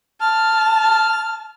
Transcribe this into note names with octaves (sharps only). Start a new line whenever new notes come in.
A5 F6